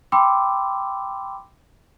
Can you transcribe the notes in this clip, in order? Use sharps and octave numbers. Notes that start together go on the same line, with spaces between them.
G5 B5 C6 D6 E6